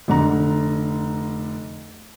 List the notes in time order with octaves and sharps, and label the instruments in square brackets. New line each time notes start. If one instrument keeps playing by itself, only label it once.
[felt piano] F1 D3 A#5